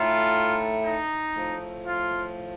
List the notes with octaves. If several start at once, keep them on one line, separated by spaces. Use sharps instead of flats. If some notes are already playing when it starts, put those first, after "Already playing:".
Already playing: A2 A3 D#4 F4
D#4
A2 F3 A3
F4